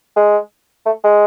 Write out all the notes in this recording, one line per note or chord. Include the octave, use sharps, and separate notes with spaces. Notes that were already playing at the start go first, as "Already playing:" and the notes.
G#3
A3
G#3